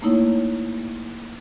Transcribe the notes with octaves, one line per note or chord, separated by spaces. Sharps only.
A3 A#3 D#4 E4 C#5